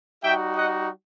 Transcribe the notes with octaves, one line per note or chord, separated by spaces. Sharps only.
G3 D#4 F#4 E5 G5
D#5 F#5